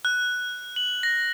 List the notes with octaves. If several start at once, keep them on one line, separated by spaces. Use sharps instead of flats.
F#6
F#7
A#6